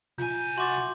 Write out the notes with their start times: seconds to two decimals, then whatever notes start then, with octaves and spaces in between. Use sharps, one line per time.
0.18 C2 F4 G#5 G6
0.58 F#4 E5 C6 D6 A6